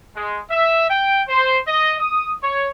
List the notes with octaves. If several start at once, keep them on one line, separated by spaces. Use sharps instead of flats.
G#3
E5
G5
C5
D#5
D#6
C#5